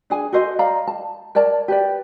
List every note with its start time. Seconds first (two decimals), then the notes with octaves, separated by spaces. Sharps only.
0.10 D4 G#4 G#5
0.33 F#4 A4 C5 D#5
0.59 D5 D#5 F5 A#5
0.87 A5
1.35 A#4 C#5 D5 A5
1.68 G4 B4 D5